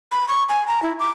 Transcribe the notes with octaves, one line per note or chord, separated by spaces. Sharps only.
B5
C#6
G#5
A#5
E4
D6